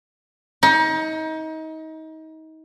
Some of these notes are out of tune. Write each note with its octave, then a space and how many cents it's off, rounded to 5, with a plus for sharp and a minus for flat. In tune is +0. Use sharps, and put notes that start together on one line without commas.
D#4 +30